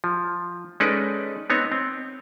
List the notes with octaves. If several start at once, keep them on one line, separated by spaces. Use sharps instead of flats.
F3
G#3 C#4 D#4 A4 B4 D5
B3 C4 D#4 C#5
C4